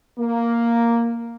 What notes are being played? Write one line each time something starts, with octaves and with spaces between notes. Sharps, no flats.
A#3